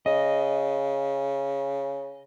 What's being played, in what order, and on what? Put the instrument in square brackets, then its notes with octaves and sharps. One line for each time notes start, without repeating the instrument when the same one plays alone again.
[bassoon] C#3 [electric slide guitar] D#5